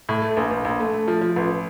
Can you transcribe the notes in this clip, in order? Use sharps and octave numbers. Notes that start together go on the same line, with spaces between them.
A2
A3
A#1
A#1
A#1
A3
A3
F3
F3
A1